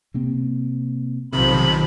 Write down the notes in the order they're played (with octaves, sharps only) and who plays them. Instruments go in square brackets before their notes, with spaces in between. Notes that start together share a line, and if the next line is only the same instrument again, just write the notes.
[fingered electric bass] C3 A#3 C4
[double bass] B1 F3 [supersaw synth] C3 D#3 [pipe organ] B5